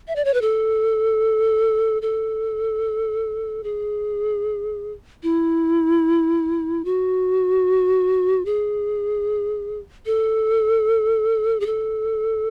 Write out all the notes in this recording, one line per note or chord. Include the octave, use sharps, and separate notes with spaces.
E5
D5
C#5
B4
A4
A4
G#4
E4
F#4
G#4
A4
G#4
A4